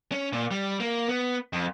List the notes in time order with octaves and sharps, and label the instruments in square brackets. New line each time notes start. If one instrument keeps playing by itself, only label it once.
[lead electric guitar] C#4
A#2
G3
A#3
B3
F2